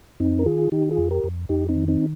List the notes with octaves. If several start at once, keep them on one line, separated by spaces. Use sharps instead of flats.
F2 C4 D#4
A#4
D#3 F4 G#4
D#3 D#4 G4
F4 G#4
F2
G4 A#4
F2
F2 D#4 G4
C4 D#4
D#3
C4 D#4